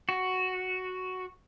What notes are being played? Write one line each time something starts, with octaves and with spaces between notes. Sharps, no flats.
F#4